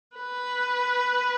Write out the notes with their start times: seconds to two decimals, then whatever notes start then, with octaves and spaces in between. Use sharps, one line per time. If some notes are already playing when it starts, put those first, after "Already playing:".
0.17 B4